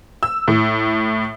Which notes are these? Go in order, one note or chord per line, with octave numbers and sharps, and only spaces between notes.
E6
A2